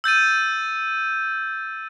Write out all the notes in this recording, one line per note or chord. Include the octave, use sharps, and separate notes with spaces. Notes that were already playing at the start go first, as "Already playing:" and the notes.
E6 G6 A6 D#7